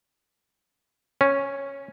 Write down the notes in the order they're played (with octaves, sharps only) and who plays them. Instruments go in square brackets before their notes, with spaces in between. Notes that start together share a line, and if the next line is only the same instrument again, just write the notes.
[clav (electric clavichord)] C#4